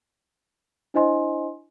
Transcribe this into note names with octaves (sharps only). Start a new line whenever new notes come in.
D4 E4 C5 D#5 G#5 C6